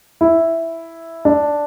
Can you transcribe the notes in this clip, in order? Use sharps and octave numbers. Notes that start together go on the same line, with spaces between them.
E4
D4